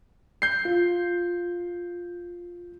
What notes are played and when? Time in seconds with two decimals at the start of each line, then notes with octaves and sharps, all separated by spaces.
0.42 G6 C7
0.65 F4